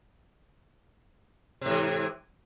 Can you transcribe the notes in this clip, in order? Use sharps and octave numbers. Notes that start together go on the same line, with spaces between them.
G#2 C3 E3